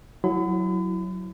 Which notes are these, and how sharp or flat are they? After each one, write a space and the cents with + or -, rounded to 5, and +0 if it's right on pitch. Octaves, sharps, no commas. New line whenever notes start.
F#3 +0 E4 +0 B5 +40